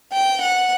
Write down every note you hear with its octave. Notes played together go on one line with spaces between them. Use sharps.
G5
F#5